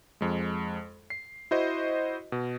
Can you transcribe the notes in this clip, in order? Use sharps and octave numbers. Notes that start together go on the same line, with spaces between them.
F2 G#3
C7
E4 F#4 C5 D#5
B2